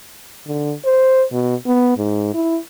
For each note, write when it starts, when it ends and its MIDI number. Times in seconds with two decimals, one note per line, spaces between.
0.47 0.74 50
0.85 1.24 72
1.32 1.55 47
1.66 1.93 59
1.97 2.29 44
2.34 2.57 64